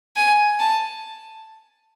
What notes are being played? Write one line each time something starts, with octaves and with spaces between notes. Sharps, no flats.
G#5
A5